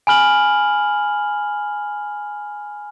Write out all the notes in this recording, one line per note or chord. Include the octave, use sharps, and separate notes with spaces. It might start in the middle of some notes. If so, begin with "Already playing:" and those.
G#5 B5 F6 F#7